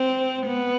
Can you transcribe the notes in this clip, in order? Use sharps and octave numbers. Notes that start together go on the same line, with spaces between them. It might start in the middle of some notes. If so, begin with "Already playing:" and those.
Already playing: C4
B3